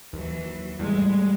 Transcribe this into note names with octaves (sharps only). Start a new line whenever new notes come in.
D#2 E3 F#3
E2 A2 G3 G#3